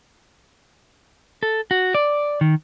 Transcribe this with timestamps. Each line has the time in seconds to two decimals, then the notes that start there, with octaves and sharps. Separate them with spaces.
1.43 A4
1.71 F#4
1.95 D5
2.41 D#3